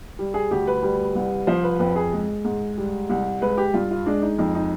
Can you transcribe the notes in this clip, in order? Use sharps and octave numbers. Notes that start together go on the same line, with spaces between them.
G3
G#4
D2 G4
B4
G3
C2
F3 C5
B4
F2 B4
G#4
G#3
G#2
G3
C2
G#3 B4
G4
G2 F4
F4
G#3 D4
D#4
F2 D#4
D#4